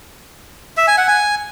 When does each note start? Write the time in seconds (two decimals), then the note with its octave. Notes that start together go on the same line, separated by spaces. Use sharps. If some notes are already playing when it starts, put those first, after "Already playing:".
0.77 E5
0.87 G#5
0.98 F#5
1.08 G#5